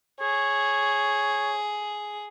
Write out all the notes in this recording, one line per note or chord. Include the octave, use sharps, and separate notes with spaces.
G#4 C#5